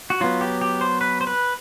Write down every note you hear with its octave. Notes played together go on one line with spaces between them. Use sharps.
F#4
F#3 B3 F4
G4
G4
C5
B4
C5
B4